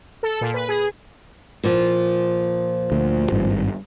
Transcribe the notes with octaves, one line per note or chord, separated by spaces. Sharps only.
A4
A#2
B4
G#4
A#2 F3
D2
G#1 G2